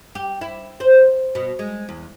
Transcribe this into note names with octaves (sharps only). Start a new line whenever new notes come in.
G4
E4
C5
B2
G#3
E2